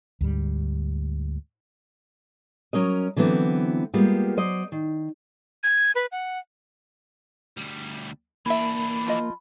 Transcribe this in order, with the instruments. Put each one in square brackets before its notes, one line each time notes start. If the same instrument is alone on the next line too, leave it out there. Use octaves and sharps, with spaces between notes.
[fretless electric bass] D2 G#2 G3
[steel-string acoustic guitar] F#3 C#4 A#4 D#5
D3 E3 F#3 B3 C4
G3 G#3 A#3 B3 F4 G4
F#3 C5 D5 D#5
D#3
[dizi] G#6
B4
F#5
[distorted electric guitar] D2 G3
[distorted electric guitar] E3 D4 [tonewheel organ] A#3 [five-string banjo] E4 E5 [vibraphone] B5
[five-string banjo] F3 F4 D#5